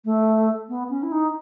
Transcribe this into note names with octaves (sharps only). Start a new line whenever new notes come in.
A3
B3
C#4
E4
D#4